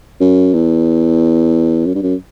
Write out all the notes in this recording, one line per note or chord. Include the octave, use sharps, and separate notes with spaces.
F#2
E2
F#2
G2
F#2